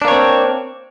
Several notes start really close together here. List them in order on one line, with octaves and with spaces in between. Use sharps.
D4 A#3 C#5 C4